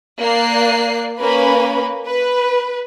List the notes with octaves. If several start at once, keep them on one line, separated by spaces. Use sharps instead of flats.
A#3 D5 F#6 C7
A#3 C#4 B4 B5
B4